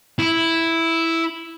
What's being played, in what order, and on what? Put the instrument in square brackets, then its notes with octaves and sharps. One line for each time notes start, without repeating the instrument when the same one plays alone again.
[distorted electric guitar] E4